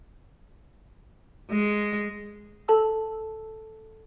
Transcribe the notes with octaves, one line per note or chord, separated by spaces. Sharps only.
G#3
A4 A5 E6